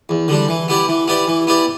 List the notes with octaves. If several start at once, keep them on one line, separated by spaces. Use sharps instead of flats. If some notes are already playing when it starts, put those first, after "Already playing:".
E2
D3 G3 D4
E3
B3 E4 G4 D5
E3
B3 E4 G4 D5
E3
B3 E4 G4 D5